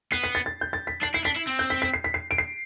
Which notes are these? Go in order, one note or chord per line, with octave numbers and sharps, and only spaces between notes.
B3 C7
B6
A6
A6
G6
A6
B6
D4 C7
E4 C7
D4 B6
E4
C4
G6
B6
B6
C7
B6
C7
D7
C7